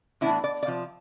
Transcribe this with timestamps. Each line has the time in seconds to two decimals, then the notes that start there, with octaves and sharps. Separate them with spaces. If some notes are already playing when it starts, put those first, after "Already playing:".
0.21 A2 E3 B3 D4 E4
0.44 D5
0.63 D5
0.66 C3 F3